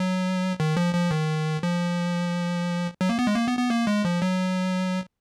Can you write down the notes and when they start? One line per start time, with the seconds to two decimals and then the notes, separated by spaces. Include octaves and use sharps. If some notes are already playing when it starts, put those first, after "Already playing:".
Already playing: F#3
0.60 D#3
0.77 F3
0.95 F3
1.11 D#3
1.63 F3
3.01 F#3
3.09 A#3
3.19 B3
3.27 G#3
3.36 A#3
3.48 B3
3.59 B3
3.70 A#3
3.87 G#3
4.05 F3
4.22 F#3